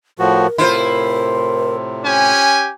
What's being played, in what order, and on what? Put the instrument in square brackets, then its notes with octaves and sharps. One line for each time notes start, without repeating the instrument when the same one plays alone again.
[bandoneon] A2 F3 F#4 [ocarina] A#4
[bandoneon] A2 C3 [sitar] E4 F4 C5
[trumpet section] C#4 G4 G#5